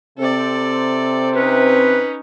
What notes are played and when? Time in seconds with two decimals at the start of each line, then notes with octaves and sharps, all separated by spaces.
0.18 C3 C4 A4 D5
1.35 C#4 D#4 B4